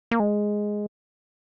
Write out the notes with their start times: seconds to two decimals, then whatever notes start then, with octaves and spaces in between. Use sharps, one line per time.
0.11 A#3
0.20 G#3